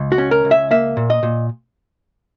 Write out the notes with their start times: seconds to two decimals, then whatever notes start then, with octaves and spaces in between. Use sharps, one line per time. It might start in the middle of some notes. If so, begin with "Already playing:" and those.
Already playing: C#2
0.12 F#4
0.18 C#4
0.31 A#4
0.45 C#2
0.51 E5
0.71 A#3 E5
0.97 A#2
1.10 D#5
1.23 A#2